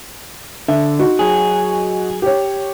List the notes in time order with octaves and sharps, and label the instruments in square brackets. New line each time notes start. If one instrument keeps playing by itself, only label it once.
[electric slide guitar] D3 [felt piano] E5
[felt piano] D#4 F#4
[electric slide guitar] F#3 G#4
[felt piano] G4 C#5